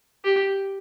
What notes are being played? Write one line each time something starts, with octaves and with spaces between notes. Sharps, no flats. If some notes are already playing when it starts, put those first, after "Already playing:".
G4